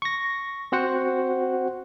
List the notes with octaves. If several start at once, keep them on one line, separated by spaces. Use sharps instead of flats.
C#6 A#6
C4 F#4 C5 F#5